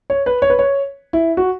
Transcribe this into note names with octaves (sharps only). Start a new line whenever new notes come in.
C#5
B4
C#5
B4
C#5
E4
F#4